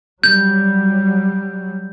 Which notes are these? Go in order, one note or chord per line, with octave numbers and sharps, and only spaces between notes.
F#3 G3 G6